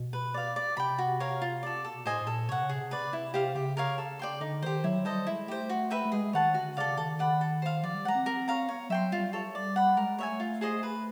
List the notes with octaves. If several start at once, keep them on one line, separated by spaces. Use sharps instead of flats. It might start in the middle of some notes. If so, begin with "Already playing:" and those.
Already playing: B2
B4
D5 F5
D5
C3 G5 B5
F#4
A#4 C#5 F5
F4
A4 D5
B2 A4
A2 C5 D#5 G#5
A2
A#2 A4
C3 C#5 F#5
C#3
G#4
C3
B4 D5
E4
G4 C5 F5
C#3 G4
A#4 C#5 F5
A4
D5 G5 C6
D3 D#4
D#3 G4 C5
F#3 E4
G3 A4 C5 D#5
G#3 E4
A3 G4 C5
F#4
B4 E5 G5
A3
G#3 G#4
D#3 C#5 F#5 A5
D3 F#4
C#3 A4 D5 F5
D#3 A4
D5 F#5 B5
A4
C5 F5
F3 D5
G3
G#3 F#5 A#5
C4
A#4
C#5 F5 A#5
B3 C#5
F#3 E5 G5 C6
G3 F4
A4 C#5
D5
F#5 B5
G#3 A#4
A3 C#5 E5 G#5
F4
G#4 C5 D#5
B4